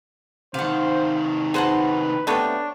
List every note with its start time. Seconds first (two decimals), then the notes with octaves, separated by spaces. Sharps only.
0.54 C3 D#3 C5 F5 F#5
1.54 D#4 F#4 G#4 B4 C5 F#5 A5
2.27 C3 A3 B3 D4 C#5 G5